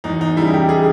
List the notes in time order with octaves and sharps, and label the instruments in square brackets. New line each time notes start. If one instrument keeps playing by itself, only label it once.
[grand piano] E2 D#4
D#4
C#3 G3 E4
G4
G#4